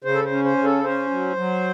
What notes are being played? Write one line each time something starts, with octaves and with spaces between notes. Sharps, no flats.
C#3 C5
A4
C5
C#4
C5
C#3
A4
C#4 C5
F#3
F#3